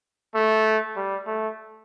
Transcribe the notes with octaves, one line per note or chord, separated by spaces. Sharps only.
A3
G3
A3